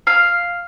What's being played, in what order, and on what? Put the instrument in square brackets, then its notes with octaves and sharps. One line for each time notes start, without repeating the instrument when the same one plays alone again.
[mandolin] F5